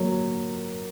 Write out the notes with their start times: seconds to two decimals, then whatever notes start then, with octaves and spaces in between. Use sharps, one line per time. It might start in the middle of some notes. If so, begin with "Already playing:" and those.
Already playing: F#3 A#3